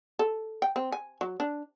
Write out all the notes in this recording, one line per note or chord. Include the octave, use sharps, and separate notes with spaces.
A4
G5
C4
G#5
F#3
D4